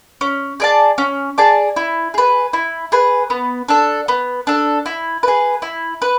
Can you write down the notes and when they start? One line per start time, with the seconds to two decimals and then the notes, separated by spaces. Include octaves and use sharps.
0.21 C#4
0.60 G#4 D5 A5
0.98 C#4
1.38 G#4 D5 A5
1.76 E4
2.14 G#4 B4
2.53 E4
2.92 G#4 B4
3.30 B3
3.68 D4 A4
4.08 B3
4.47 D4 A4
4.86 E4
5.23 G#4 B4
5.62 E4
6.02 B4